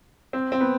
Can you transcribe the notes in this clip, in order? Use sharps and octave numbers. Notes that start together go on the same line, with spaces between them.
C4
C4
B3